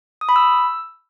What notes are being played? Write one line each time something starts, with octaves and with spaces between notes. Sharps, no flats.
D#6
B5
E6